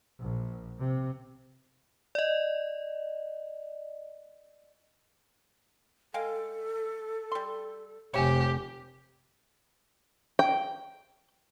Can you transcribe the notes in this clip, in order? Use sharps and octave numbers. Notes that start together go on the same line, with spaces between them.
A#1
C3
D5 D#5
G#3 A4 F5 G5
G3 C6
F1 G4 C5 C#5 E5 G#5
G5